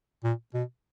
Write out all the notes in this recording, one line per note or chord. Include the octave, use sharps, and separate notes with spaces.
A#2
B2